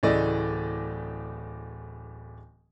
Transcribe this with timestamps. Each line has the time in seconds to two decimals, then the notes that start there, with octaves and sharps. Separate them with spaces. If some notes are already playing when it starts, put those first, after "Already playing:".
0.03 D1 C#3 E3 A3 D5 D#5